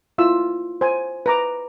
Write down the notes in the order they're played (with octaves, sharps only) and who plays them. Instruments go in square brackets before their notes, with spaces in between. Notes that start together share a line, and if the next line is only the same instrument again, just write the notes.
[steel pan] E4 F4 E6
C5 G#5
B4 A#5 D6